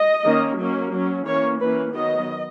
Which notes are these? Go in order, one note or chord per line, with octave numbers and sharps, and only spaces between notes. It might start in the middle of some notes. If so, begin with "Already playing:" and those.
Already playing: D#5
D#3 A#3 C#4
F#3 A#3 C#4
F#3 C#4
E3 A#3 C#4 C#5
E3 A#3 C#4 B4
D#3 F#3 B3 D#5